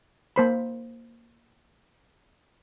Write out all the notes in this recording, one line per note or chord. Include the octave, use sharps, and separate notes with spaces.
A#3 C5 B5